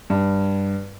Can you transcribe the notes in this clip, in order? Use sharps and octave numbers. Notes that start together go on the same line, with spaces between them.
G2